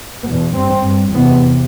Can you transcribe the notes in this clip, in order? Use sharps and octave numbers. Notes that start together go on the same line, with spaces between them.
E2 B2 B3
G2 C4
G2
E2 C3 B3